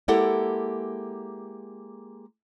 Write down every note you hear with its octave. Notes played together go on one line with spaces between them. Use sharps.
G#3 A#3 E4 G4 A4 F#5